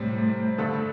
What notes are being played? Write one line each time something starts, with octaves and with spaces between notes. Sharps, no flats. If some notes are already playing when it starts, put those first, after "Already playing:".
Already playing: A2 C3 G3 C4
G2 D3 A3 D4 A4